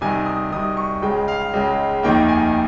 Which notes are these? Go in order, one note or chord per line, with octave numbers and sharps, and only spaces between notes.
C2 C3 D#3 G#5
D#6
C2 C3 D#3 D#6
C#6
C#2 C#3 G#3 G5
F5
C#2 C#3 G#3
F1 D#2 D#3 A#3 G5
G#5